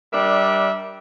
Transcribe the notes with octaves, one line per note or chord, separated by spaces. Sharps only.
G3 D4 A#4 E5